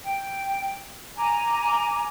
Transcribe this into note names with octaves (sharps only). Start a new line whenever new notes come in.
G5
G#5 A#5 D6